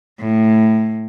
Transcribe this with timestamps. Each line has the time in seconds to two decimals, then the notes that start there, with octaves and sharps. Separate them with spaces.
0.20 A2